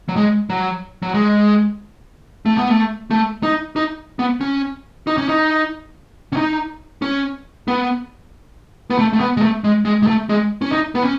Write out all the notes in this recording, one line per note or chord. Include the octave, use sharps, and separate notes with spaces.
F#3
G#3
F#3
F#3
G#3
A3
B3
A3
A3
D#4
D#4
B3
C#4
D#4
C#4
D#4
C#4
D#4
C#4
B3
B3
A3
A3
B3
G#3
A3
G#3
G#3
G#3
A3
G#3
C#4
D#4
B3
C#4